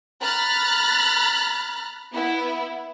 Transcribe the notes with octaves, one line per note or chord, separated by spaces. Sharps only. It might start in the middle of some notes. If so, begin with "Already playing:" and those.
A#5 B5 F6 F#6 A6
B3 E4